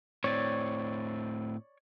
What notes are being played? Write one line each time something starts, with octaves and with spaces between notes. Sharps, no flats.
A2 C4 C#5 D5